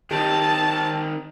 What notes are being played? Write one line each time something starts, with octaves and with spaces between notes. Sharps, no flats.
D#3 C4 D#4 G4 A5